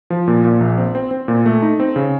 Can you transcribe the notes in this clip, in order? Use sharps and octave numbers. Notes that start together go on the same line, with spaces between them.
F3
A#2
A#2
A#1
C4
C4
C4
A#2
A3
D#4
C4
C#3